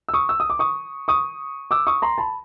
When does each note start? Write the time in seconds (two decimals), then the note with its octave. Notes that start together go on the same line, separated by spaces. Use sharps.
0.09 E6
0.14 C#6 D#6
0.29 E6
0.40 D#6
0.50 D6
0.59 C#6 D#6
1.08 C#6 D#6
1.71 D6 E6
1.87 C#6 D#6
2.02 A#5 C6
2.18 A5 B5